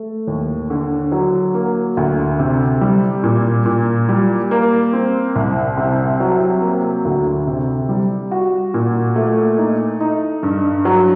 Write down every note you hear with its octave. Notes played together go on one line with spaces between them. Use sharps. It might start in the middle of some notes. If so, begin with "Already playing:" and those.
Already playing: A3
D#2
D3
F#3
A#3
D2
C3
G3
A#2
A#2
G3
A#3
C4
C2
C3
F#3
A#3
D2
C3
G3
F#4
A#2
A3
D#4
D#4
G2
F#3